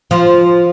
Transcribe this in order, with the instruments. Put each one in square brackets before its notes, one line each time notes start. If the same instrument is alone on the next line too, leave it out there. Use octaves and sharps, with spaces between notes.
[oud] F3